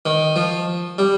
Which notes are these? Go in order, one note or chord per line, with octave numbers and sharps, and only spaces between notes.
D#3
F3
G3